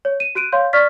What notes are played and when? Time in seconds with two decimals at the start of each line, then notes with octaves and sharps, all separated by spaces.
0.05 C#5
0.20 D#7 E7
0.35 F#4 F#6 D7 D#7
0.52 C#5 F5 C6 G6
0.73 D5 C#6 F6 A6 B6